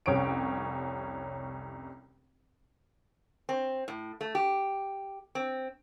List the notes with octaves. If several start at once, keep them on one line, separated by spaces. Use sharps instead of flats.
F1 C2 C#4 C#5 D7
C4
A2
A3
G4
C4